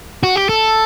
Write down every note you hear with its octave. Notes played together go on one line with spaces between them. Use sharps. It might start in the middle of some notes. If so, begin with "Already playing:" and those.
F#4
G4
A4